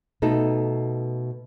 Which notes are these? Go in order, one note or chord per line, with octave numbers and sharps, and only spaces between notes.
B2 A3 D#4 A4